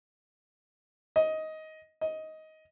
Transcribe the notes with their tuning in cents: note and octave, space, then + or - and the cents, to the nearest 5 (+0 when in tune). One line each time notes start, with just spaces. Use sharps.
D#5 +15
D#5 +15